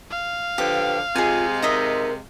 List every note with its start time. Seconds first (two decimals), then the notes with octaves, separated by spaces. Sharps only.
0.11 F5
0.58 D3 F3 G4 B4 D6
1.16 C3 G#3 F4 G#4 G#5
1.62 D#4 A#4 D#5 E5